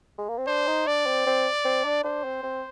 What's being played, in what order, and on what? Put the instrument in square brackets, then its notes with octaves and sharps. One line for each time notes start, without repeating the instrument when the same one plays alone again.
[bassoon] G#3
A#3
C4
[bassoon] D4 [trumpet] C5
[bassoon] D#4
[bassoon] D4 [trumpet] D5
[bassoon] C4
C4
C4
D4
[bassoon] D4 [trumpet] C5
[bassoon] C4
C4